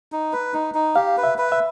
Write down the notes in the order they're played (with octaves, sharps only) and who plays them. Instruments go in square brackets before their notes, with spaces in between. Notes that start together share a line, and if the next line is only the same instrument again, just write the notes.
[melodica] D#4
B4
D#4
D#4
[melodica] G4 [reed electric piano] F5
[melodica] B4
[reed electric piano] E5
[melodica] B4
[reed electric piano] E5